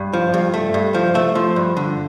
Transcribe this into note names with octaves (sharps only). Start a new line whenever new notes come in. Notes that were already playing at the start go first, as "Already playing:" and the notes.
Already playing: G2
F3
G2
A3
G2
F3
A3 E5
F3
G2
D3